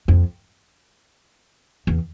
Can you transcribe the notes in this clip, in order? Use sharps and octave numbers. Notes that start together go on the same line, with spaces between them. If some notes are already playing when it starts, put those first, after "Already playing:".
F2
E2